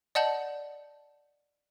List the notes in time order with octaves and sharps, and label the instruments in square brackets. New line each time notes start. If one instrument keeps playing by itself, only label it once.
[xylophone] D5 D#5 F#5 A5 G6 F#7